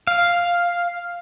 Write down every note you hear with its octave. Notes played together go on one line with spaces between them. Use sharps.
F5